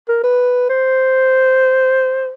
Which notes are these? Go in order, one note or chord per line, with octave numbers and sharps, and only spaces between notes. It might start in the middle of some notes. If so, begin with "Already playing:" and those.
A#4
B4
C5